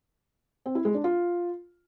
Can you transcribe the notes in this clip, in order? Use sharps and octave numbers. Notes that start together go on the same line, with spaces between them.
C4
E4
G#3
D4
F4